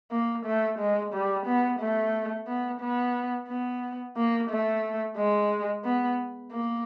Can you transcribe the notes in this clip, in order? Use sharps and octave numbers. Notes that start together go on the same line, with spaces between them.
A#3
A3
G#3
G3
B3
A3
B3
B3
B3
A#3
A3
G#3
B3
A#3